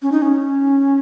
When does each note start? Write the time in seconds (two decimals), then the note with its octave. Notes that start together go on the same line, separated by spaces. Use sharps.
0.02 C#4
0.12 D#4
0.22 C#4